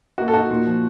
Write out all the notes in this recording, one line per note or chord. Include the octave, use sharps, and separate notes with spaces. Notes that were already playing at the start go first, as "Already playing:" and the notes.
A#3 F#4
A4
D#4 F#4
A#2
F3